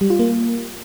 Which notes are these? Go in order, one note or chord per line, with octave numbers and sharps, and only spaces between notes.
G3
F4
A#3